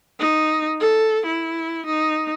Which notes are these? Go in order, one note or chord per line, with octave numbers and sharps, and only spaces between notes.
D#4
A4
E4
D#4